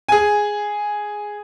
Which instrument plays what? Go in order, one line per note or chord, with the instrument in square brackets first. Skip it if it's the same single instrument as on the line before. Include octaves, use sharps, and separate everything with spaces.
[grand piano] G#4 G#5